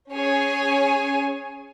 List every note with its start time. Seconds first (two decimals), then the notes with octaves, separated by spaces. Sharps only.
0.12 C#4 G#4 C#5 G#5